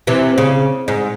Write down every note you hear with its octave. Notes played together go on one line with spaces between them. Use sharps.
C3 E3
C#3
G#2